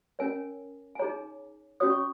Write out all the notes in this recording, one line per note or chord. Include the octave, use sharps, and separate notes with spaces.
C#4 A#4 C#5 G#5
G#5
D#4 G#4 C#5 A#5
C#4 F#4 C#5 D#6
C#6